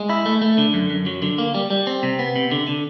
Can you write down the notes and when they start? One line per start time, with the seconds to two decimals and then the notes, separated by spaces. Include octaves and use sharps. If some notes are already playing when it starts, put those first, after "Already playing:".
Already playing: G#3
0.09 E4
0.26 A3
0.42 A3
0.58 D3
0.74 F#2
0.90 F#2
1.06 F#3
1.22 D3
1.38 A#3
1.54 G3
1.71 G3
1.87 C4
2.03 C3
2.19 B3
2.36 C3
2.51 D3
2.67 D3